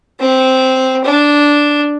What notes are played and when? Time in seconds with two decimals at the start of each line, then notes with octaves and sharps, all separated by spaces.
0.20 C4
1.04 D4